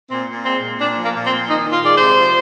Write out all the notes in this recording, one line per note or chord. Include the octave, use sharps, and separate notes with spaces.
A#2 C4
A#2
G#3 C4
A#2
A#2 D4
F3
A#3
A#2
C4
A#2
D#3 D#4
D#3
F4
G#3 D5
C5
C3
F3